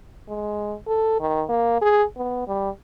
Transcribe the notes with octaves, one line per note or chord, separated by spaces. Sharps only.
G#3
A4
D#3
A#3
G#4
B3
G3